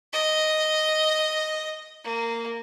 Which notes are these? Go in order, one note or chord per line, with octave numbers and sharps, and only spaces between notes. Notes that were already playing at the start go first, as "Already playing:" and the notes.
D#5
A#3